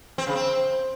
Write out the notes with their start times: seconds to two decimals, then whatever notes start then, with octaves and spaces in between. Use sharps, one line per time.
0.18 C4
0.27 C#3
0.36 C4